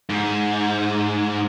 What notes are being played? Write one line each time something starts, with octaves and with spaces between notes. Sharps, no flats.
G#2